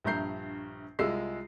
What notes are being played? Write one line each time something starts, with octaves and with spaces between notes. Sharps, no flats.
A#1 G2 E5 A#5 G6 C7
C2 G#3 F4 E6 C7